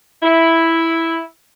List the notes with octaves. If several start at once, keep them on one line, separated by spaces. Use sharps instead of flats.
E4